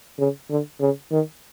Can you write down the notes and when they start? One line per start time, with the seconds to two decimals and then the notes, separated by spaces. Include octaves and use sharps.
0.19 C#3
0.50 D3
0.80 C#3
1.11 D#3